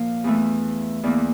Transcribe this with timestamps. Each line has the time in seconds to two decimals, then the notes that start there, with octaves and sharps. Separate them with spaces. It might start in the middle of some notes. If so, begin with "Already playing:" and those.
Already playing: A#2 F3 A#3 F5
0.24 E2 E3 A3
1.03 E2 E3 A#3 D5